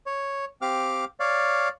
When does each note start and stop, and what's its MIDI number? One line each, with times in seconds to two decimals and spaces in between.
0.06 0.45 73
0.62 1.05 60
0.62 1.05 67
0.62 1.05 77
0.62 1.05 86
0.62 1.05 89
1.20 1.69 73
1.20 1.69 74
1.20 1.69 77